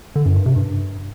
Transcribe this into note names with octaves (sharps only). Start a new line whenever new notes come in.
D3
F#2
G2
C3
G2